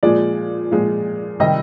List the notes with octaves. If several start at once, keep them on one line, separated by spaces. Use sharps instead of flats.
A#2 F3 G#3 D5
A#2 F3 G#3
C3 D#3 G3 D#5